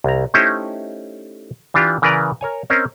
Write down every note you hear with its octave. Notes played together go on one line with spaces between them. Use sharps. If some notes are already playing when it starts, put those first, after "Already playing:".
C2 A#5
A3 C#4 D#4 E4 G4 C5
E3 D4 F4 G4
C#3 E3 A#4 B4 D5 A#5
A#4 C#5 G#5
C4 C#4 A#4 C5 D#5